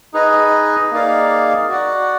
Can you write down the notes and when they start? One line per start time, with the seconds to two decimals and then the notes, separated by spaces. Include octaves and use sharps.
0.13 D#4 G#4 B4 D#5
0.91 A#3 D#4 G#4 D5 F5
1.69 F#4 D5 F#5